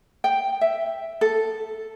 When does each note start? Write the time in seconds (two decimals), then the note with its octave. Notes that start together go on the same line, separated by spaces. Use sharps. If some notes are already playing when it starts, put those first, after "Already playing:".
0.24 G5
0.61 E5
1.21 A4